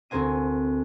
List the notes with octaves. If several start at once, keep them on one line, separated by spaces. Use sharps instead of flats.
D2 C4 A#4 C5 G#5 D#7